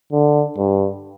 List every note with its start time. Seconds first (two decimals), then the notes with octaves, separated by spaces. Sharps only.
0.12 D3
0.58 G2